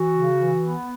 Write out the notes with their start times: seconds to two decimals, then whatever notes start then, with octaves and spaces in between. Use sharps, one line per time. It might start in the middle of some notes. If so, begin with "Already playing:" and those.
Already playing: E3 F#4
0.13 C#3
0.36 E3
0.59 B3